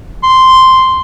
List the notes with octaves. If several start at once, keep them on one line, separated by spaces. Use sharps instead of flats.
C6